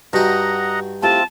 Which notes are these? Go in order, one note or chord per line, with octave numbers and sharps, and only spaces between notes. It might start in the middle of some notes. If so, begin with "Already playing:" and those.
G2 D#4 F#4 D#5 F#5 A#5
A3 C4 E4 F4 G4 A5